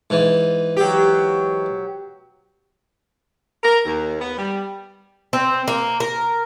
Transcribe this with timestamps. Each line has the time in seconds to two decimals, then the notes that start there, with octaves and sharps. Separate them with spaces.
0.10 G#2 E3
0.77 F#3 G4
3.64 A#4
3.85 D#2
4.20 B3
4.38 G3
5.33 C4
5.68 A#3
6.00 A#4